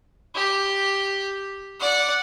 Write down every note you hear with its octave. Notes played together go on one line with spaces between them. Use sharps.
G4
D5 F#5